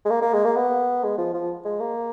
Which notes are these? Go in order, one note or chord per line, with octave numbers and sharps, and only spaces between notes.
G#3
A#3
A#3
G#3
A#3
B3
G#3
F3
F3
G#3
A#3